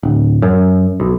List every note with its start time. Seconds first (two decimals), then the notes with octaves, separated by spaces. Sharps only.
0.03 D1
0.42 F#2
1.00 B1